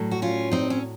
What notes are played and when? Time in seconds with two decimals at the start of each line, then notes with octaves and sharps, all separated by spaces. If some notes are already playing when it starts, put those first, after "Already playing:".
Already playing: A2 F#3
0.11 F#4
0.22 C#4 F4
0.51 C4 D#4
0.70 C#4